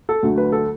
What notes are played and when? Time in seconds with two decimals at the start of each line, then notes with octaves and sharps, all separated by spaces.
0.09 A4
0.23 D2 D3 F#3 A3
0.38 B4
0.52 A4